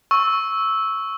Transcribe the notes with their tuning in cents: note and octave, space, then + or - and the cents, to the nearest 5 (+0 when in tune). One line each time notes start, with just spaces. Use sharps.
C#6 +0 E6 -10